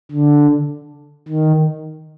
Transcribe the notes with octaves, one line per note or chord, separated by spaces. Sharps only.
D3
D#3